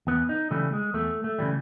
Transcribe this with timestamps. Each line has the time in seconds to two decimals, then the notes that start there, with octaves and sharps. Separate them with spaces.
0.07 E2 B3
0.29 D#4
0.51 C#3 E3 G3 A3
0.73 G#3
0.94 E2 A3
1.24 A3
1.39 C#3 E3 G3